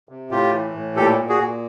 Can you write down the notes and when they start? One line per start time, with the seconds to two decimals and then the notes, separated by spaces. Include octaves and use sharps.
0.09 C3
0.31 A2 F4 G4
0.53 E3
0.74 A2
0.96 A#2 G4 A4
1.18 A#2
1.29 F#4 G#4
1.40 A#2